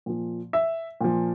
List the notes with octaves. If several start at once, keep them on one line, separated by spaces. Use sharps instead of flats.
A#2 F3
E5
A#2 F3